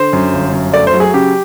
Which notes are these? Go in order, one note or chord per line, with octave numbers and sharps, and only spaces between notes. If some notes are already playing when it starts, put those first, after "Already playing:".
Already playing: D3 C5
F#2
G1
F#2
A3 D5
C5
F#3
G#4
C#3 G4